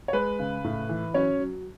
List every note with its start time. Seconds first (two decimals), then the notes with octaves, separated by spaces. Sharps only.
0.08 C#5
0.13 G#3 B4
0.39 C#3
0.64 A2
0.89 E3
1.14 F#3 C#4 C#5
1.40 F#3